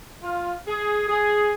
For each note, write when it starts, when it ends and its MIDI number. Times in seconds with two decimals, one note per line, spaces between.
0.23 0.54 65
0.67 1.06 68
1.09 1.52 68